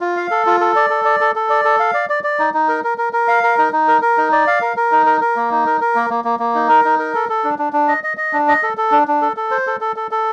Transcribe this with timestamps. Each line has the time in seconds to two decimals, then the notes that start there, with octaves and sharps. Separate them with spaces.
0.01 F4
0.17 F5
0.31 A4
0.46 F4
0.60 A4
0.76 D5
0.90 A4
1.05 D5
1.20 A4
1.36 A4
1.50 D5
1.65 A4
1.80 F5
1.94 D5
2.09 D5
2.24 D5
2.39 D#4
2.54 D#4
2.68 A#4
2.84 A#4
2.98 A#4
3.13 A#4
3.28 F5
3.43 A#4
3.58 D#4
3.73 D#4
3.88 A#4
4.02 A#4
4.18 D#4
4.32 D5
4.47 F5
4.61 A#4
4.77 A#4
4.92 D#4
5.06 A#4
5.21 A#4
5.36 A#3
5.51 D#4
5.66 A#4
5.81 A#4
5.95 A#3
6.10 A#3
6.24 A#3
6.39 A#3
6.55 D#4
6.69 A#4
6.84 D#4
6.99 A#4
7.15 A4
7.29 A4
7.44 D4
7.59 D4
7.73 D4
7.88 D#5
8.04 D#5
8.17 D#5
8.33 D4
8.48 D#5
8.63 A4
8.77 A4
8.92 D4
9.08 D4
9.22 A4
9.37 A4
9.51 C5
9.67 A4
9.81 A4
9.96 A4
10.11 A4